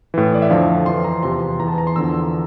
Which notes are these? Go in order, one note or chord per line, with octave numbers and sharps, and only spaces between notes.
A2 E3
D5
E5
F2 D3 F3 F5
F2 E3 C6
A#5
E2 C3 F3 C6
E2 E3 A5 A#5
A#5
C6
E2 D3 F3 E6